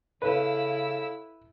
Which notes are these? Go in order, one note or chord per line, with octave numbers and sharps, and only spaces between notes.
C#3 E4 A4 B4 C#5 F5 E6